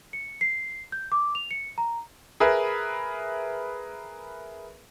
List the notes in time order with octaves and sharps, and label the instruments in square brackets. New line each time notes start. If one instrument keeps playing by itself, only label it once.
[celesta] C#7
C7
G6
D6
F7
C#7
A#5
[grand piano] G#4 A#4 B4 E5